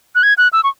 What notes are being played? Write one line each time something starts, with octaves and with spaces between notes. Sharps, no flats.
F#6
G#6
F#6
E6
C#6